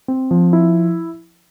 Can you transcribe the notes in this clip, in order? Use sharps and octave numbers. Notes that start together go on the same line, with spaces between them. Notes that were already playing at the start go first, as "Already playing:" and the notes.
C4
F3
E4